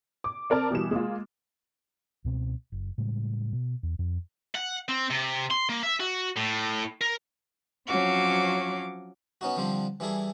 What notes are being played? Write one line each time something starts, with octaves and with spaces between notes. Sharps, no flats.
D6
C4 A#4 D5 A5
B2 E3 G3 E7
G#3 A#3 F4
C#2 B2 C4
F#1
A2 C#3 G3 G#3
B2
E2
F2
F#5
C4
C3
C6
A#3
E5
F#4
A2
A#4
F3 F#3 C4 C#4 F#4 D6
B3 C#4 D#4 F#4
D3 F3 G3 C4 D4
E3 G3 E4 G#4 A4